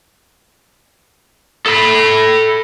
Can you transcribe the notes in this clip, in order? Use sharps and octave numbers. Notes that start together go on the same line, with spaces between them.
A4 B5